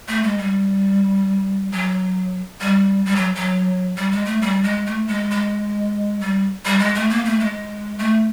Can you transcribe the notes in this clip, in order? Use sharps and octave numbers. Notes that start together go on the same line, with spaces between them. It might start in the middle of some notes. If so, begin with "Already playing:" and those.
A3
G#3
G3
F#3
G3
G3
F#3
F#3
G3
G#3
A3
G3
G#3
A3
G#3
G#3
G3
G3
G#3
A3
A#3
A3
G#3
A3